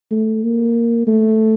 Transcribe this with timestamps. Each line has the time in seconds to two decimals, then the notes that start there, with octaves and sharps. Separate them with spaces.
0.11 A3
0.43 A#3
1.07 A3